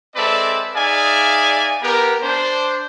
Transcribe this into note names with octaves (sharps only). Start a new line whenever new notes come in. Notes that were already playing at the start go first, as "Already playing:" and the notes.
G#3 C4 A4 B4 D5 E5
D#4 G#4 D5 E5 F5 G#5
B3 G4 A#4
D4 C5